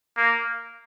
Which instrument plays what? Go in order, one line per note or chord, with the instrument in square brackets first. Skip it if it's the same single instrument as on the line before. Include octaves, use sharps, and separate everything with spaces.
[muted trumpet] A#3